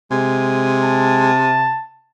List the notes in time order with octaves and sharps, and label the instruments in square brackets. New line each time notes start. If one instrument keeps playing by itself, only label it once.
[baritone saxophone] C3 [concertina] G#3 G#5
[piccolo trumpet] A5